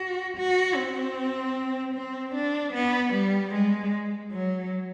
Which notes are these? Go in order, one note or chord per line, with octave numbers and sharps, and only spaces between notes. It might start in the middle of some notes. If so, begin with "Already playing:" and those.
Already playing: F#4
F#4
C4
C4
D4
B3
G3
G#3
F#3